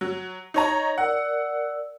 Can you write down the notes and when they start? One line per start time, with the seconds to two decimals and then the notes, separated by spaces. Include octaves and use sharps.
0.01 F#3
0.54 D#4 C#5 A#5
0.98 A#4 D5 F#5 E6